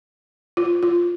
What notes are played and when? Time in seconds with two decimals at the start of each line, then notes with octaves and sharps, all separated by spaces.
0.57 F4
0.83 F4